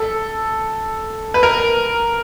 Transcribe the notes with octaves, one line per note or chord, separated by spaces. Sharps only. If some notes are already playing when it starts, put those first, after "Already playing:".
Already playing: A4
B4
A#4